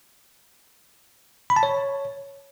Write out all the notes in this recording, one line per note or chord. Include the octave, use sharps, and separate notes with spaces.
B5
A5
C#5